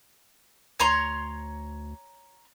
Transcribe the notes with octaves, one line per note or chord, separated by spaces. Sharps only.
D2 C#5 A#5 C6